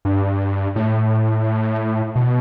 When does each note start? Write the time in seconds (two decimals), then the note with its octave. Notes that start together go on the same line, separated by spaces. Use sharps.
0.05 G2
0.76 A2
2.16 B2